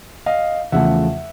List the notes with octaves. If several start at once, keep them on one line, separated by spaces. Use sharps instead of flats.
D#5 F5
E2 C#3 F3 A3 E5 F#5